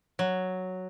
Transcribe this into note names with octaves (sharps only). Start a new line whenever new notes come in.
F#3